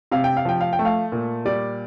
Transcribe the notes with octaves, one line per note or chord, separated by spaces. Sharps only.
C3 F5
G5
F5
F3 G5
F5
G5
A3
F5
A#2
G3 D5